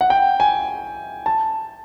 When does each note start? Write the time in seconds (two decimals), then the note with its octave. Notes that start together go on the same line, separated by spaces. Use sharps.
0.01 F#5
0.10 G5
0.40 G#5
1.26 A5